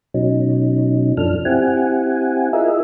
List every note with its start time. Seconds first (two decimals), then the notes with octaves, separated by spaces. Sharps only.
0.14 B2 F#3 C#4 D#4
1.17 F#2 F3 D4 A4 F6
1.45 C4 E4 G4 F#5 G#5
2.53 E4 F4 G#4 A#4 D#5 E5